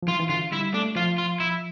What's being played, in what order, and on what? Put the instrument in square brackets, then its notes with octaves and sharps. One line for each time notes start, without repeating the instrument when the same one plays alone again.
[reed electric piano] F3
[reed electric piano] E3 [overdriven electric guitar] F4
[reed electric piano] E3
[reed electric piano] D3 [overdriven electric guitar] F4
[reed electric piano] G3 [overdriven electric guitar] E4
[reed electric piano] A3 [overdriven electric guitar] D4
[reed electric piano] F3 [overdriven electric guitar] F4
[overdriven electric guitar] F4
E4